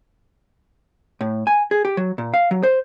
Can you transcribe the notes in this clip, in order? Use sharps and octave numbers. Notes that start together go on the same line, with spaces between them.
A2
G#5
G#4
G4
F#3
A#2
F5
F#3
C5